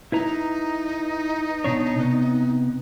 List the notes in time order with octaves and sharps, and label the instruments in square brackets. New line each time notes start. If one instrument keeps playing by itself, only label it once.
[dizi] D#4 [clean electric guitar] E4 B4 A#5
[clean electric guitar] B2 D4 C#5
C3 B3